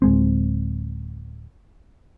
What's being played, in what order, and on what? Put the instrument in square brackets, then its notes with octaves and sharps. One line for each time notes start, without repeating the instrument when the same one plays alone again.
[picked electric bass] D1 G#3 C4